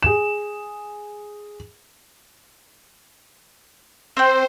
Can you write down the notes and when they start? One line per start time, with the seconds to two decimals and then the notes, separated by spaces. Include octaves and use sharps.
0.03 G#4 E7
4.17 C4 C5 G5